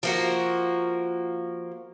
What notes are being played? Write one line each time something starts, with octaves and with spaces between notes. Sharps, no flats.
F3 A#3 F#4